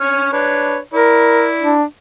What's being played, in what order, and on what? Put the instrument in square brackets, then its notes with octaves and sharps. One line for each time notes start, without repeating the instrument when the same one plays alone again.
[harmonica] C#4 C#6 F6
D4 B4 C#5
[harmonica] E4 D5 [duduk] A#4
[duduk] D4